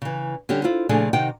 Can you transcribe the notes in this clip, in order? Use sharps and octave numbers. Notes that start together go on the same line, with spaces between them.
C#3 E3
D3 G3 C#4 G4
E4 F4 C5
A#2 C#3 F3 A3 D4 G#4
C3 D#3 D#4 F#5 G5